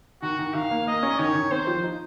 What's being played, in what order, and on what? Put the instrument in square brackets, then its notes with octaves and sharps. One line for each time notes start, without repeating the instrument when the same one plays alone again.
[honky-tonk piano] D#3 [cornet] F#4
[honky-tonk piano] D#3
[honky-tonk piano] D#3 [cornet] F5
[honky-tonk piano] A#3
[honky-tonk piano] A#3 [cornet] D#5
[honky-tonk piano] C#4
[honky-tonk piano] D#3 [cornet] C#5
[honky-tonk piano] D#3
[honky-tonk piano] C4 [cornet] C5
[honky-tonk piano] F3
D#4